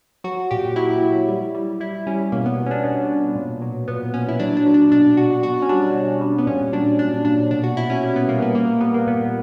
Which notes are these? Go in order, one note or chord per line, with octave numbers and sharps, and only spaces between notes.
F#3 F#4
A#2 G4
F#3 E4
F#3
G3
G3
G3 E4
G3 C#4
B2 A#3
B3
B2
C#4
D4
B2 B3
B2
A#2
F#3
A#2 B3
A#2 C#4
E4
F#3 D4
D4
F#3
D4
B2 D4
B2 F#4
B2 F#4
C#4
G3 D4
B2
G3
B3
A#2 C#4
F#3 D4
A#2 D4
A#2 D4
B2 D4
F#4
B2 E4
C#4
G3
B3
G3 A#3
B3
A#2 A#3
G3 B3
A#3
A#2 B3